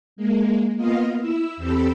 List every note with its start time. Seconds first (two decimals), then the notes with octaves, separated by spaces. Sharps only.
0.16 G#3 A#3
0.77 A#3 B3 F4 D#5 F5
1.20 E4 E6
1.57 E2 C4 G4 A4 B5 E6